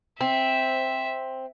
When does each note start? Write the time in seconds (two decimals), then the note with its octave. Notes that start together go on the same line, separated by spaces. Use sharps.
0.21 C4 E5